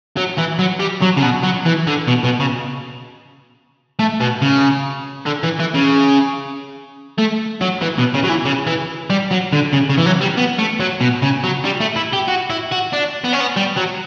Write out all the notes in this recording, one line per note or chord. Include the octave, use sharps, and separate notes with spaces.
F#3
E3
F#3
G3
F#3
C#3
B2
F#3
E3
D3
B2
B2
C#3
A3
B2
C#3
D3
E3
E3
C#3
A3
F#3
E3
B2
C#3
F#3
E3
C#3
E3
G3
F#3
D3
C#3
C#3
E3
F#3
G3
B3
A3
F#3
B2
C#3
F#3
G3
A3
E4
G4
F#4
E4
F#4
D4
B3
C#4
B3
G3
F#3